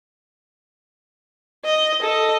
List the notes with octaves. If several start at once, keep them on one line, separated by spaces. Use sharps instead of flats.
D#5
A4 D#5